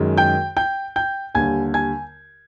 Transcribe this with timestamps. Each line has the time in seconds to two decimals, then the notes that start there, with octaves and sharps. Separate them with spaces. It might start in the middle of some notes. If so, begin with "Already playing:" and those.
Already playing: F#2 D#3 G#3
0.18 G5 G6
0.57 G5 G6
0.96 G5 G6
1.35 D#2 D3 G3 G#5 G#6
1.74 G#5 G#6